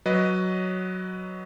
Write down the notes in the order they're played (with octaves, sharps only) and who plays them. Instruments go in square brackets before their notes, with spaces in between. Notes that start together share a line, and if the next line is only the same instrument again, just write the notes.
[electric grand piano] F#3 B4 D#5